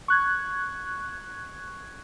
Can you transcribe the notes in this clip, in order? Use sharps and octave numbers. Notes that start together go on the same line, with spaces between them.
C#6 F#6 G#6